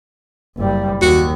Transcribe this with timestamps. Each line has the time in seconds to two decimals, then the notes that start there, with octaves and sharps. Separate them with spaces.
0.58 F#1 G3
1.02 D#2 F#4